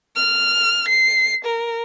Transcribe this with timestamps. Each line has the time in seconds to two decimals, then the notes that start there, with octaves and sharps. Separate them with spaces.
0.17 F6
0.88 C7
1.45 A#4